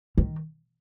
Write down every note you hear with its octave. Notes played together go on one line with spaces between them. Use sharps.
D#3